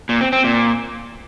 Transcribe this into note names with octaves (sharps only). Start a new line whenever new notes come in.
A#2
C4
C4
A#2